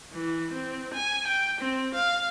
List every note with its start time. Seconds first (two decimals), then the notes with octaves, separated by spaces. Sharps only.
0.13 E3
0.53 C4
0.94 G#5
1.27 G5
1.61 C4
1.95 F5